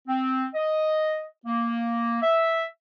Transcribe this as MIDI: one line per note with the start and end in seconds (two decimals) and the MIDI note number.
0.08 0.46 60
0.54 1.25 75
1.46 2.19 58
2.22 2.64 76